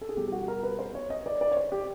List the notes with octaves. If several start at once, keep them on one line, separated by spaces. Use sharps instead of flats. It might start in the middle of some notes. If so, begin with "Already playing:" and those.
A4
G#4
B2 G3 G4
G4
F#4
A#4
B4
C5
C#5
D#5
D5
D5
C#5
C5
G4